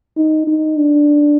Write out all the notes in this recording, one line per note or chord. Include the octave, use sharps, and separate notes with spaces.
D#4
D#4
D4